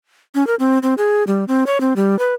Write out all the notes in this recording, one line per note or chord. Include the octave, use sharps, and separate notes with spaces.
C#4
A#4
C4
C4
G#4
G3
C4
C#5
C4
G3
B4